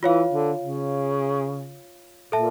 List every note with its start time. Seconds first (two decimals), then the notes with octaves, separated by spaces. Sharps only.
0.03 E3 F4 C#5 F5
0.31 D3
0.60 C#3
2.32 A#2 A4 E5 A5